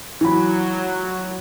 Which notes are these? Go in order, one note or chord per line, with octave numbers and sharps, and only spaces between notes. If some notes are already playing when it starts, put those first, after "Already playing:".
E3 F#3 B5